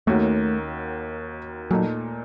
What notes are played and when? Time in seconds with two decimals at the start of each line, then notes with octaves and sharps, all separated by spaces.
0.07 D#2 D#3 A3 A#3 C#4 F#4
1.71 A#2 F#3 A3 D#4